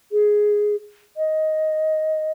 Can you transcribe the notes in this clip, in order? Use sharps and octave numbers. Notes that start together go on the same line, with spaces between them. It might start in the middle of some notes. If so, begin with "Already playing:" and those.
G#4
D#5